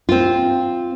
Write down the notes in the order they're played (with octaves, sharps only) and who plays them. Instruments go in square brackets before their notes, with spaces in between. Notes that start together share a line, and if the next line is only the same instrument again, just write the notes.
[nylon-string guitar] C4 F4